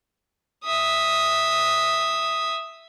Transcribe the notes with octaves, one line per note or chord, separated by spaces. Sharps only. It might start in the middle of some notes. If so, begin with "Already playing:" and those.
E5 D#6